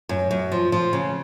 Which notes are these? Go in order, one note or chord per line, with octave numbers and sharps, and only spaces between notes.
F#2
F#2
F3
F3
C#3